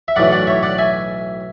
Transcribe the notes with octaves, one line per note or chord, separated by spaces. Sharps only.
E5
B1 A2 E3 D5 F#5
D5 F#5
C#5 E5
D5 F#5
E5 G#5